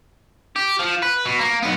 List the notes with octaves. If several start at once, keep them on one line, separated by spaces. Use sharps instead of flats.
G4
F3
B4
B2
A#3
B1 B3